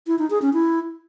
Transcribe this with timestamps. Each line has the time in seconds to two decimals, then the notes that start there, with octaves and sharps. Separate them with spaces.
0.07 E4
0.19 D#4
0.30 G#4
0.42 C#4
0.53 E4